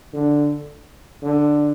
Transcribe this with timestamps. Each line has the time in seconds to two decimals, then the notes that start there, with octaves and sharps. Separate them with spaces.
0.13 D3
1.22 D3